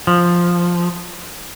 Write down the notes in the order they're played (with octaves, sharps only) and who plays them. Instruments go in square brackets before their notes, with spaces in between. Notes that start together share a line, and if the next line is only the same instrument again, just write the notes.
[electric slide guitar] F3